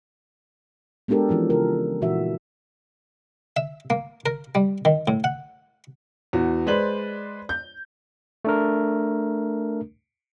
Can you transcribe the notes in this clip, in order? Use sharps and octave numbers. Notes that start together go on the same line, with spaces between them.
G#3 B3 D4 G4 A4 A#4
E3 F3 C#4 F4
C#3 A4 A#4
A#2 E3 F#4 E5
E5
A#3
A#4
G3
D#3
A2
F#5
E2 F#4
G#3 B4 C5 D5 F#7
G6
A3 D4 A#4